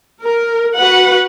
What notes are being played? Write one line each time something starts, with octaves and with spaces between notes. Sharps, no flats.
A#4
F#4 B4 F#5